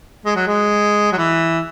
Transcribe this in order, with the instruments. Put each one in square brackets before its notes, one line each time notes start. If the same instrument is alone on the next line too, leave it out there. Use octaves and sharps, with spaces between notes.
[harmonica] G#3
F#3
G#3
F#3
E3